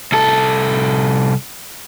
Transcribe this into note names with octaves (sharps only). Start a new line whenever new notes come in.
C2 A4